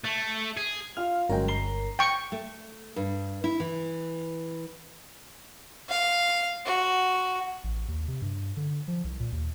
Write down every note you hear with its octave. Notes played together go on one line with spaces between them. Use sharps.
A3
G#4
F4 F5 F6
G1 F#3 G#3 C#4 A#4 G5
A#5 C7 G7
G5 C#6
A3
G2
E4
E3
F5
F#4
A1
D#2
C3
G2
D3
F3
C2
A#2
D#2